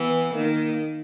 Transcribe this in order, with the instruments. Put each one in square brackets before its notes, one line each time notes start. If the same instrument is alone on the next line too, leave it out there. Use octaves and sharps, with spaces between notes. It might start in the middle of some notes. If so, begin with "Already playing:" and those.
Already playing: [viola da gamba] E3 [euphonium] B3
[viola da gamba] D#3 [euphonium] A#3